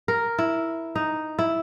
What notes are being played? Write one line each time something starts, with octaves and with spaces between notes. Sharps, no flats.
A#4
E4
D#4
E4